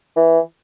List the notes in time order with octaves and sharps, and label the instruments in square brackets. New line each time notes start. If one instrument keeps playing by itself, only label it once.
[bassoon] E3